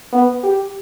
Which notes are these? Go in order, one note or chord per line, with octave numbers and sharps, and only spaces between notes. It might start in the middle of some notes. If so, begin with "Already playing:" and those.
B3
G4